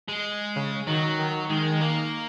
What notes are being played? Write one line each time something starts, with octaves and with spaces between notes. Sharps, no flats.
G#3
C#3
D#3 F#3
D#3
D#3 G#3
A#3